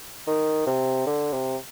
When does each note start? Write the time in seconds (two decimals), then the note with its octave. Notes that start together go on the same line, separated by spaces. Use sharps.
0.27 D#3
0.67 C3
1.06 D3
1.33 C3